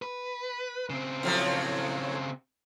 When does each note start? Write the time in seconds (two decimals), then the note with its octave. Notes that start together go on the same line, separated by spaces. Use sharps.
0.02 B4
0.90 C#3 C4
1.23 A2 F3 F#3